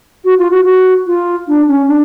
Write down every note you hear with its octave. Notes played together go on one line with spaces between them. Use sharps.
F#4
F4
F#4
F#4
F4
D4
C#4
D4